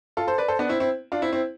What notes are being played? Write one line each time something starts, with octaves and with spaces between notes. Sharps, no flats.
F4 A4
A4 C5
B4 D5
A4 C5
B3 D4
C4 E4
C4 E4
D4 F4
C4 E4
C4 E4